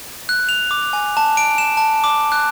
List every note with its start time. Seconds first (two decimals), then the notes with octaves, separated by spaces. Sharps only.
0.29 F#6
0.49 F7
0.71 D6
0.93 G#5
1.17 A5
1.37 D7
1.58 E7
1.77 A5
2.04 D6
2.32 F#6